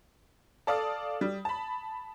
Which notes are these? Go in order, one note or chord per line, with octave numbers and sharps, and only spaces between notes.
A4 D5 F5 D#6
G3
A5 B5